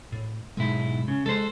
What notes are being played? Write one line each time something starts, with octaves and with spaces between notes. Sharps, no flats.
A2
B1 G#2 G#3 E4
C#3
G#3 A4 C5